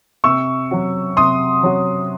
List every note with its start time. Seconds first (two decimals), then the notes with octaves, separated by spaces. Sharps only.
0.24 C3 C#6 E6
0.71 F#3 C#4 F#4
1.17 C3 C6 D#6
1.63 F#3 C#4 F#4